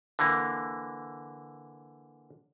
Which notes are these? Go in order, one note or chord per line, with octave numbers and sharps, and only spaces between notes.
D3 E3 A#3